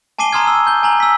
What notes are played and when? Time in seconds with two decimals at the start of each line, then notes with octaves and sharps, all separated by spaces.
0.18 G#5 A5 D6 C7 D#7 G7
0.33 A#5 C6 D#6 F6 G#6
0.47 E6
0.67 G6 G7
0.83 G#5 A#5 F#7
1.00 E6 B6